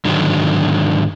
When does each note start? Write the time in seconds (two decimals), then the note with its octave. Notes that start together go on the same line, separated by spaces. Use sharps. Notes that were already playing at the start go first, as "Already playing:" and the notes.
0.05 G#2 D3 D#3 F#3